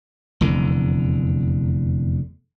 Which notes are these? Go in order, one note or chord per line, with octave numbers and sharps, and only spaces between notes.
F1 E2 D3